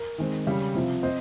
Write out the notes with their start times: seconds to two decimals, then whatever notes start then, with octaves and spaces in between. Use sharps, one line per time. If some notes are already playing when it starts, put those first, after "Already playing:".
Already playing: A#4
0.18 D#3 G#3 C4
0.47 C#3 G3 C#4
0.74 C3 F3 C4
1.03 C4 C5 D#5